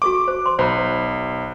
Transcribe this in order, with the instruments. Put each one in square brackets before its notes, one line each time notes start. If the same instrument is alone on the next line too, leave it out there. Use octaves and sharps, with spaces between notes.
[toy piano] F#4 A4 C#6 [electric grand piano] D6
[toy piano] C5
C6
[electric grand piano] B1 [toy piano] C5 A#5 B5